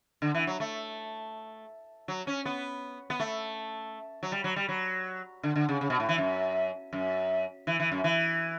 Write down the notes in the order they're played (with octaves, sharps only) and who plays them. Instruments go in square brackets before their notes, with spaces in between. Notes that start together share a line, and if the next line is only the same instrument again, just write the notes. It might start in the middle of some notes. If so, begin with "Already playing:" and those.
[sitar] D3
E3
F#3
A3
F#3
C#4
B3
B3
A3
F#3
G3
F#3
G3
F#3
D3
D3
C#3
C#3
B2
A2
E3
F#2
F#2
E3
E3
F#2
E3